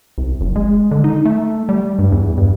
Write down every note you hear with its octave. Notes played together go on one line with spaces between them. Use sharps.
C2
F#1
G#3
D3
D#4
A3
G3
G2
E2
G2